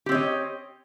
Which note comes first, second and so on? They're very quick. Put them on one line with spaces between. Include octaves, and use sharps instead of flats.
G4 C4 C#5 D#5